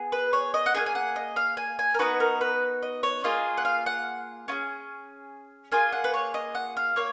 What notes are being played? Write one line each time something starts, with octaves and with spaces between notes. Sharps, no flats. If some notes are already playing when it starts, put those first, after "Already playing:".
Already playing: B3 G#4
B4
C#5
D#5
F#5
A#3 D#4 G#4 G#5
G#5
F#5
D#5
F5
G#5
G#5
A#4
B3 D#4 F#4 B4
A#4
B4
D#5
C#5
A#3 F4 G#4 D#5
F#5
F5
F#5
C#4 F4 G#4
A#3 F4 G#4 G#5
F#5
B4
C#5
D#5
F#5
F5
A#3 C#5